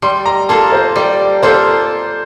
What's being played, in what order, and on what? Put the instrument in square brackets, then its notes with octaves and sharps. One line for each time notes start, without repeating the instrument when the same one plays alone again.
[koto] G3 [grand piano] C6
[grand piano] A#5
[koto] A#3 F4 A4 [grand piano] A5
[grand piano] C5
[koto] G3 [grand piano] D5
[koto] A#3 F4 A4 [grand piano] C5